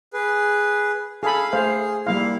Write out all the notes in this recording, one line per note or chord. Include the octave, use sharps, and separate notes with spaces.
G#4 B4
G#4 A4 F5 B5
A3 G#4 C5 F5
G3 A#3 E4 F5